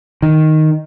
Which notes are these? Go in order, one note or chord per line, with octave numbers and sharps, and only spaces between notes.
D#3